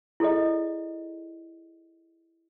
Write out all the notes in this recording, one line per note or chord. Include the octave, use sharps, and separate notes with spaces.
E4 G#4 A4 D5 D#5